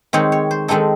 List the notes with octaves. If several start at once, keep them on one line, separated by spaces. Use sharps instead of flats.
D#3 G#3 C4 D#4 C#5
C#5
C5
D#3 G#3 C4 D#4 A4